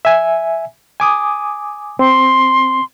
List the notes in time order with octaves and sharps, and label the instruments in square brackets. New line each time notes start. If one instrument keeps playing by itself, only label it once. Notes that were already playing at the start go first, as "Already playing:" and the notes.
[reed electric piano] E5 G#5
G#5 D6 D#6
[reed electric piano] C4 [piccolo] C6